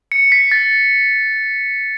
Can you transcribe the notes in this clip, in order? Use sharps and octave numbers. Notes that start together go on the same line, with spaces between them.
C#7
B6
A6